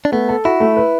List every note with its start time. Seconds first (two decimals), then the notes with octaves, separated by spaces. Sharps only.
0.05 D4
0.12 A3 B3
0.29 A4
0.45 E4 F#4
0.60 A3
0.77 B4